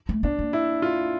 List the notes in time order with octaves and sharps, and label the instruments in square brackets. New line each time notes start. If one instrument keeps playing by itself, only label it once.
[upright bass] A3
[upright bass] B3 [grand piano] D4
[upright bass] A#3
[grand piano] E4
F4